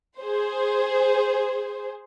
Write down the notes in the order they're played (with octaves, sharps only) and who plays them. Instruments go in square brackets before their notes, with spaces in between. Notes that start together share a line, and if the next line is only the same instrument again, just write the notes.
[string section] G#4 C5